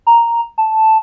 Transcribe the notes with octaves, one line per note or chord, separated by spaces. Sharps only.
A#5
A5